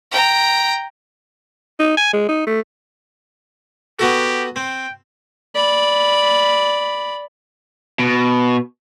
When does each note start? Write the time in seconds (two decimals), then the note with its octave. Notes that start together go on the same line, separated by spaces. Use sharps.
0.11 G5 A#5
1.79 D#4
1.97 G#5
2.13 G#3
2.29 D#4
2.47 A3
3.99 B3 F#4 G4 A4
4.56 C4 G5
5.55 D5 B5
7.99 B2